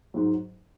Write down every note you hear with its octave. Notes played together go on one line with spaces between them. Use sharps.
G#2 F#3